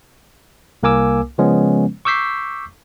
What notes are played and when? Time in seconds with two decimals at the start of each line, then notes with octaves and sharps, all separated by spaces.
0.83 C2 A#3 A#4 G#5 D6 E6
1.38 C#3 F3 G#3 B3 C#4
2.05 C#6 D6 E6 G6 B6 C7